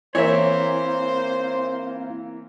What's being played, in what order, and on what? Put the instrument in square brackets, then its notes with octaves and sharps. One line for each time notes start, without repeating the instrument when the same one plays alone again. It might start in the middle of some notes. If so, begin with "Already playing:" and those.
[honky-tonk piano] E3 A#3 [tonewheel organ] C4 E4 F5 [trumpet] C5 [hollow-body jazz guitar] C#5 E5